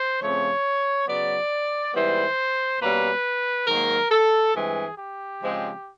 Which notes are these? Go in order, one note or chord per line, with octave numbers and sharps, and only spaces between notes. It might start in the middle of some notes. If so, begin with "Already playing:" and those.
Already playing: C5
C#3 F3 A3 C4 C#5
C#3 F#3 B3 D5
G#2 E3 G3 B3 C5
B2 G3 A#3 C#4 B4
G#2 D#3 F#3 A#3 A#4
A4
G2 E3 G#3 C4 G#4
G4
C#3 F3 G#3 C4